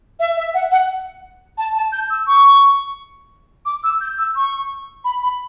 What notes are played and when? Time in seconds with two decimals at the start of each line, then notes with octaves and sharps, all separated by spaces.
0.20 E5
0.36 E5
0.54 F#5
0.71 F#5
1.58 A5
1.75 A5
1.92 G6
2.10 E6
2.27 C#6
3.65 D6
3.84 E6
4.01 G6
4.18 E6
4.35 C#6
5.04 B5
5.22 B5